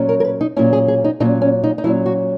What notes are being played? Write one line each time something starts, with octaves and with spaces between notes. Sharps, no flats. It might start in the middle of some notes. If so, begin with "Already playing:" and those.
Already playing: A#2 F#3 C#4
A#4
A#4
B4
D#4
A#2 F#3 C#4 E4
G#4
G#4
D#4
A#2 F#3 C#4 D#4
C#4
D#4
D#4
A#2 F#3 C#4 E4
F#4